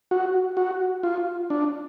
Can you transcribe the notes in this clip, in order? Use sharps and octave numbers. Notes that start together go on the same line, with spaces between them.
F#4
F#4
F4
D4